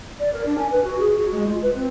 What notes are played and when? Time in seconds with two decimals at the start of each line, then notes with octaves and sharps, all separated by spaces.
0.19 D5
0.33 A#4
0.46 D4
0.58 G#5
0.71 B4
0.84 F#4
1.00 G#4
1.17 F#4
1.32 G#3
1.46 F4
1.62 B4
1.76 C4